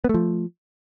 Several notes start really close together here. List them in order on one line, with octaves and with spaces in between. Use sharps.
B3 A3 F3